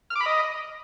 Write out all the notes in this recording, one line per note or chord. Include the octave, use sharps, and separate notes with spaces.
F6
D6
B5
D#5